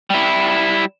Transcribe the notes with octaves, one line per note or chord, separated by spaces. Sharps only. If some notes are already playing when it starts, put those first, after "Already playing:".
G3 E4